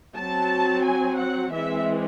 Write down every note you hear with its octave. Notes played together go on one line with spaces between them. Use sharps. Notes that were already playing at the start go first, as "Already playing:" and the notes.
F#3 C4 A5
G#5
F#5
E3 G#3 C4 E5